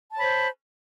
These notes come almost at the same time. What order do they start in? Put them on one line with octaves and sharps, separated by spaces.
A5 C#5 B5 C5